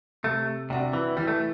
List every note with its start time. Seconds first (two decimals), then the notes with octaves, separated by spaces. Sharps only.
0.24 C3 A3
0.70 C3 G3 D4 F#4
0.93 E3
1.17 E3 G3
1.28 A3